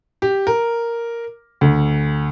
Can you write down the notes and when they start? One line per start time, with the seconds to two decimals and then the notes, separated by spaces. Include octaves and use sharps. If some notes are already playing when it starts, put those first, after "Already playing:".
0.22 G4
0.47 A#4
1.61 D2